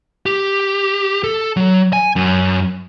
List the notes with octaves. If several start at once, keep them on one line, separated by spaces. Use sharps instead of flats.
G4
A4
F#3
G#5
F#2